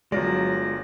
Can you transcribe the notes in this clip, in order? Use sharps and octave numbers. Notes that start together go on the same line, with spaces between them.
G1 F#3 G#3 F4 F#4 D5 A#6